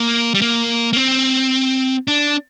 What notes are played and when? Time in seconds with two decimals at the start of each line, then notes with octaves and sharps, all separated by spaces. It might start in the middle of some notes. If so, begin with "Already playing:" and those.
Already playing: A#3
0.34 G3
0.41 A#3
0.93 A#3
0.96 C4
2.08 D4